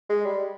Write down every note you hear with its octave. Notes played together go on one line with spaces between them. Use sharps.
G#3
G3